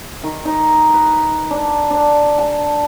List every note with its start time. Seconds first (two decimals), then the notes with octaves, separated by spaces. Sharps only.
0.24 D#3
0.45 D#4
0.94 B4
1.51 D4
1.90 D4
2.39 A5